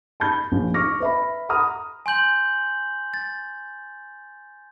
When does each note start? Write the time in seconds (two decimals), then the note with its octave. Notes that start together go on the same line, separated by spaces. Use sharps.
0.20 A5 B5 G6
0.52 A#1
0.74 C#6 D6 F6 A#6
1.00 B4 E5 B5
1.49 F#5 A#5 B5 D#6 F6
2.06 G#5 C6 G6 F#7
3.14 A6